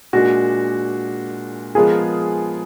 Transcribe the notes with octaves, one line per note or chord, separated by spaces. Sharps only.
A#2 G#3 D4 F#4
F3 G#3 B3 F4 G#4 A#4